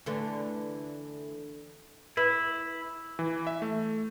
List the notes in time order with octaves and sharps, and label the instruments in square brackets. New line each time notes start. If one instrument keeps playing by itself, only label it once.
[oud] D3 E3 A3
[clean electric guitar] E4 [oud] B4
[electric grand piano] E3
E5
A3